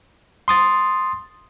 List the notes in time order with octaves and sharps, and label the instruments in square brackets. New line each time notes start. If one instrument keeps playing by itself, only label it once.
[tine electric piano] C6 D#6 A6